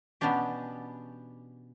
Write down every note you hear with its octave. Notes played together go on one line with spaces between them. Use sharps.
B2 E3 B3 C#4 D4 G4